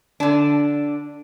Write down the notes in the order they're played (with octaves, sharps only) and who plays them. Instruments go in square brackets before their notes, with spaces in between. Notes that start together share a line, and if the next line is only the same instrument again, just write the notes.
[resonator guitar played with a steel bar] D3 D4